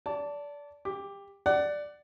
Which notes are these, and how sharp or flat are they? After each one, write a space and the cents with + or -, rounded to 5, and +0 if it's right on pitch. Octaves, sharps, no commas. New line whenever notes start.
D5 -25 A5 +10
G4 +25 D6 +0
D5 +5 F#5 +25